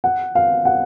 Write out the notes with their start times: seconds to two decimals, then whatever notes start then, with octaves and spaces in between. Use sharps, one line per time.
0.04 F#5
0.35 F5
0.65 F#5